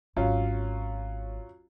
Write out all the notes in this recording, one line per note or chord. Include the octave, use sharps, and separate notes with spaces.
G#1 F#3 C#4 F4